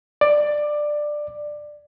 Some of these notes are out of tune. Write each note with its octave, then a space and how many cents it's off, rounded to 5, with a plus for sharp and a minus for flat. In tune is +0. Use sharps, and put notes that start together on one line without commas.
D5 +15